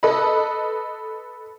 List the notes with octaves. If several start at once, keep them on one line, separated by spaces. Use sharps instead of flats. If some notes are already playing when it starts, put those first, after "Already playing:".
A4 B4 D#5 B5